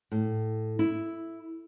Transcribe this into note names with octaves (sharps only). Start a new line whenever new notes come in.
A2
E4